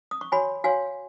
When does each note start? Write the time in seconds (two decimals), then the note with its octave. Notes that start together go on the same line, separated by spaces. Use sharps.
0.11 D#6
0.21 C#6
0.32 F#4 C#5 G#5 B5
0.64 F#4 C#5 F5 G#5